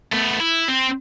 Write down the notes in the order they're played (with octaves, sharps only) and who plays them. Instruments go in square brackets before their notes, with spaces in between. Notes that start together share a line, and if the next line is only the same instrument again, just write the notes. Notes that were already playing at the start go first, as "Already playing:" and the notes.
[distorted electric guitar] A3 B3
E4
C4